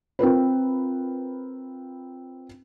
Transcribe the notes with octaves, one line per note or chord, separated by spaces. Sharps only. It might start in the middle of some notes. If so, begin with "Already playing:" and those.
C4 F4 A#4 B4